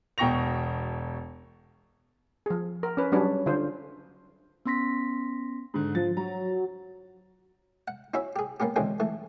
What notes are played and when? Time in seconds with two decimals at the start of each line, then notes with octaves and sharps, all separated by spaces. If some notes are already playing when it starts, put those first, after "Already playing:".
0.18 E1 B2 G5 C#6 A#6 F7
2.46 F3 G#4
2.83 A#4
2.97 C#4 B4
3.12 F#3 G3 C#4 D4 B4
3.46 D3 F4 C5
4.66 B3 C#4 C6 A#6 B6
5.74 G#2 D3
5.95 F3 A6
6.17 F#3 A#5
7.88 F#5
8.14 C#4 E4 F#4 C#5 E5
8.36 G4 G#4
8.60 A#3 B3 C#4 G4
8.76 B2 D3 E3 G#3 C4 C#4
9.00 E3 A3